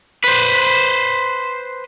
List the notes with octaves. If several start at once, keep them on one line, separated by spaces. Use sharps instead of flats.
B4 C5